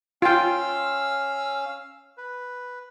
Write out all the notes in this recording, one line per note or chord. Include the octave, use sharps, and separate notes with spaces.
C#4 F4 F5 G5 E6
B4